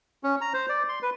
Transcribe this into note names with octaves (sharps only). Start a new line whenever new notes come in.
C#4
A#5
C5
D5
C6
B4